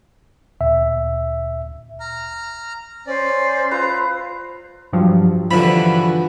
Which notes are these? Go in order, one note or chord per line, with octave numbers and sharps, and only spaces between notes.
D2 A#2 E5
A#5 F6
C#4 C5 D5
F4 B4 E5 A#5
G2 F3 F#3
G2 D3 E3 F3 F#4 B5